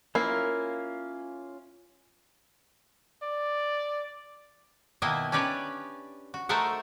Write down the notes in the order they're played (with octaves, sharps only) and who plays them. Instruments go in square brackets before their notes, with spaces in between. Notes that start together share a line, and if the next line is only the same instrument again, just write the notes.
[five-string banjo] A#3 [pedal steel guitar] C#4 F4 F5 [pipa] E4
[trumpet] D5
[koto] B2 D#3 A#3 E4 B4 D#5
C#4 D4 G4 B4 C#5 D5
F#4
A3 D#4 A#4 C5 E5 F#5